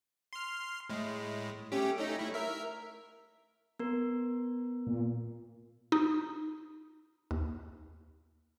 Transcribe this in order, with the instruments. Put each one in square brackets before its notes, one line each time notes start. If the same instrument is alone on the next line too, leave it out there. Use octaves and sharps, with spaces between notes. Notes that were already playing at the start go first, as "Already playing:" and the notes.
[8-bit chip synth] C6 F6
A2 G#3
A3 C#4 G4
A3 C#4 D#4
A3 E4
A#4 E5
[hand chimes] B3 A#4
[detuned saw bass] A#2
[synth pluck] D#4
D#2